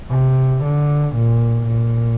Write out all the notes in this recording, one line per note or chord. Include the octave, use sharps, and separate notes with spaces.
C3
D3
A#2
A#2